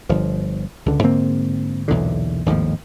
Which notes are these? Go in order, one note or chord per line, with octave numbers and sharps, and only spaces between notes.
G1 F3
C#2 D3
G#2 D3 A#3 C4
B1 E2 A#2 D3
G#1 D#2 A2 F3